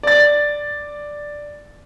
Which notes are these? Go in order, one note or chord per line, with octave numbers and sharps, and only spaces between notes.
D5 A6